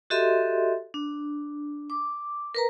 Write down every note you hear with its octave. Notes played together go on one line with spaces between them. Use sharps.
F#4 G4 A4 D#5 E5 C6
D4
D6
A#4 B4 A#5